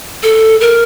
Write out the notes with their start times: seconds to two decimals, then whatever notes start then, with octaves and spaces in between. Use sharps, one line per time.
0.23 A4
0.61 A#4